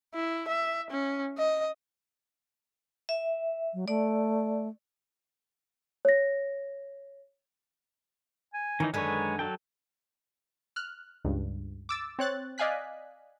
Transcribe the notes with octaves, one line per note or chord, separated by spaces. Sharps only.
E4
E5
C#4
D#5
E5
F#3
A3 D5
C#5 A#6
G#5
D#3 E3 C#4 D#4
F#2 D3 D#3 G#3 B4 C#5 G#5
F#3 A4 G5
F6 F#6
C#2 G2
D6 E6 A6
C4 C#5 F#6 A6
D5 D#5 F5 G#5 F#6 B6